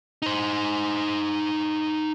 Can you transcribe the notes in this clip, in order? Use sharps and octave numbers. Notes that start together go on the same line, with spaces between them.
D#4 C5